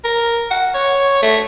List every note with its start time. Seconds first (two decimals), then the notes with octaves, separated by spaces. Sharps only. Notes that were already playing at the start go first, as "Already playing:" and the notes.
0.04 A#4
0.51 F#5
0.74 C#5
1.22 A3